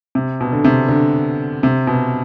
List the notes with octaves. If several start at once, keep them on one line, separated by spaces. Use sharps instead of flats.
C3
B2
D3
C3
D3
C3
B2